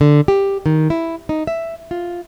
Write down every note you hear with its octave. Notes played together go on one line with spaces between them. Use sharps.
D3
G4
D#3
E4
D#4
E5
F4